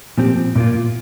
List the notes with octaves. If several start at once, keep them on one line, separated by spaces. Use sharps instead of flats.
A#2 F3 C4 G4
A#2 A#3 F4